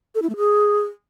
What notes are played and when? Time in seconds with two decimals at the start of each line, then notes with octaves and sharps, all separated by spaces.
0.15 A4
0.22 E4
0.30 A3
0.37 G#4